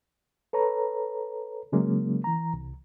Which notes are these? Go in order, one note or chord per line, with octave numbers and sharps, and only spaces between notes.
A4 B4 C#5 A#5
C#3 F#3 G#3 A#3 C#4
E3 A#5
C2